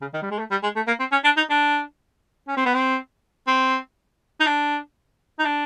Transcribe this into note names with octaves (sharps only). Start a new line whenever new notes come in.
C#3
D#3
G3
G#3
A3
G3
G#3
A3
A#3
C4
C#4
D4
D#4
D4
C#4
C4
B3
C4
C4
D#4
D4
D#4
D4